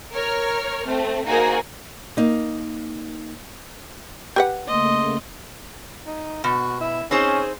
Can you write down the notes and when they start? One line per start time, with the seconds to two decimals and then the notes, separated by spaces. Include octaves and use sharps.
0.13 A#4 C#5 F6
0.86 A3 C4
1.26 A#3 D#4 F#4 G#4 A#4 C5
2.17 A#3 D#4
4.36 G4 B4 F#5
4.67 C#3 A3 A#3 D#5 C6
6.06 D#4
6.44 B2 F#4
6.81 E4
7.11 C4 C#4 D#4 G#4 C5